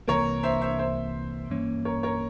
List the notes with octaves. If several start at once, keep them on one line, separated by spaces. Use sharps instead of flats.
C2 C3 E3 A#3 A#4 C#5
C5 E5
C5 E5
C5 E5
G2 E3 A#3 C#4
A#4 C#5
A#4 C#5